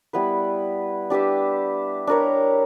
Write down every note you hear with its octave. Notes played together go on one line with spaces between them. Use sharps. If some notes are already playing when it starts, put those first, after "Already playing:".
G3 B3 E4 B4
D4 G4 B4 E5
D4 A#4 C#5